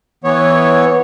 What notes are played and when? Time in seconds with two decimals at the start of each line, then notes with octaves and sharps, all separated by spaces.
0.24 E3 B3 C#5